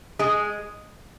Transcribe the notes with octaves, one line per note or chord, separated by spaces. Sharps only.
G#3 G#4